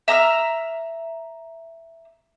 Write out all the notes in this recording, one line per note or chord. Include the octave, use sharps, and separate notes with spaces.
E5 A#5 E6 F6